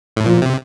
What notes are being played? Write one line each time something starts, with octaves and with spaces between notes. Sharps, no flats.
A2
A#2 F3
C3